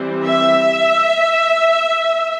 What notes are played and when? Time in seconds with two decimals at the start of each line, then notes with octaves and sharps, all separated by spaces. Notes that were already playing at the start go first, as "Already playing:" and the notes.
Already playing: E3 G3 C4
0.26 E5